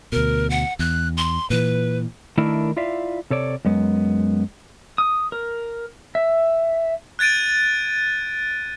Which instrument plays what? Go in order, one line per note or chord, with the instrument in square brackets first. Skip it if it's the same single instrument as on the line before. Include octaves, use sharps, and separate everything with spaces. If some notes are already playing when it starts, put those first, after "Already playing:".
[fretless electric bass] D2 B2 [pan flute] A#4
[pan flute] F#5
[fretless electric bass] E2 [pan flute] F#6
[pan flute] C6
[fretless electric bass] A#2 E3 [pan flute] B4
[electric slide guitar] D#3 A3 D4 E4 A#4
E4 F4 D5 E5 F5
C3 A4 C#5 D5
F#2 G#3 B3
[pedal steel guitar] D#6
A#4
E5
[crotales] F#6 G#6 A6 D7 D#7